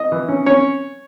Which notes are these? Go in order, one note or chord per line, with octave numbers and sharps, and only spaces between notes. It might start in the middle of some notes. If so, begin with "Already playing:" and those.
Already playing: D#5
E3
C#4
C#4 C#5